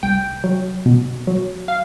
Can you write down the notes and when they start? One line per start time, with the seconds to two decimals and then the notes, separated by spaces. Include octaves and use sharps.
0.03 C2 G5
0.44 F#3
0.86 B2
1.27 F#3
1.68 F5